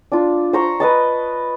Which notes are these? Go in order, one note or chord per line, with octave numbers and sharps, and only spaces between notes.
D4 F4
C5 A#5 C#6 E6
B4 D#5 A5